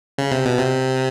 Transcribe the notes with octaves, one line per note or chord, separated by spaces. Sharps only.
C#3
C3
B2
C3